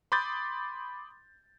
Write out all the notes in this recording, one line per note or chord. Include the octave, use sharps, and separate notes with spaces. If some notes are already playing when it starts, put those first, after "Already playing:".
B5 C6 D6 D#6 G6 A6